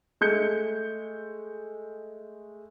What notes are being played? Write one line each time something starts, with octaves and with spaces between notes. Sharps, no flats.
G#3 A3 G6 C#7